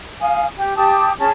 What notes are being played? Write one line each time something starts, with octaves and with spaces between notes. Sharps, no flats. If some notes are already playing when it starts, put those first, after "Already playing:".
F5 G#5 D#6
G4
G4 A5 D6 D#6
C#4 G#4 A5